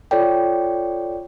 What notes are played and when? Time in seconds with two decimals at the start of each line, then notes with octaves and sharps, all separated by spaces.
0.11 F4 A4 C#5 D5 G5